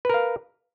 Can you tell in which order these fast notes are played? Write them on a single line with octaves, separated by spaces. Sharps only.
B4 A#4 F5